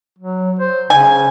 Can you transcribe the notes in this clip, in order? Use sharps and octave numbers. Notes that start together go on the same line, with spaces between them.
F#3
C5
C#3 G#5